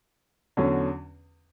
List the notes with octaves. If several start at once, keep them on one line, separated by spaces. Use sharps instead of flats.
E2 D3 F#3 C#4